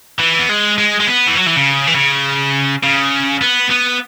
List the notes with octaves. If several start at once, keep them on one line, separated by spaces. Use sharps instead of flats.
E3
B3
G#3
G#3
G#3
B3
E3
F#3
E3
C#3
E3
C#3
C#3
B3
B3